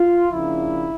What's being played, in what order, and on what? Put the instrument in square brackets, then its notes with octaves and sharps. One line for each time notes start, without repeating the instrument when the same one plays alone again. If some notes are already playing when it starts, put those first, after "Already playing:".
Already playing: [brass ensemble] F4
C#3 F3 A#3 D4 E4